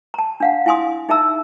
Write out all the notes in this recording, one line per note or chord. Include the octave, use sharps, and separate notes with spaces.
A5 A#5
D4 F5 F#5
E4 F5 G#5 C6 D#6
D#4 G#4 E5 A5 A#5 E6